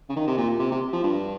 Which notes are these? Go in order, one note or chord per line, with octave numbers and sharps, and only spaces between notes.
C#3
D#3
C3
A#2
A#2
C3
C3
F3
G2